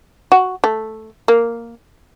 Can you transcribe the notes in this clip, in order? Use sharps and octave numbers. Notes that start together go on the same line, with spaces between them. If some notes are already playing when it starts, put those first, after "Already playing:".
F#4
A3
A#3